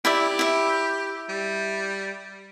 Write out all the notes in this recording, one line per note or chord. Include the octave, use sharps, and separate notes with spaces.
E4 G4 D5 E5
E4 E5
G3